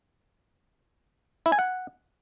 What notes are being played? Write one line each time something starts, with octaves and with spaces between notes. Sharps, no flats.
E4
G#5
F#5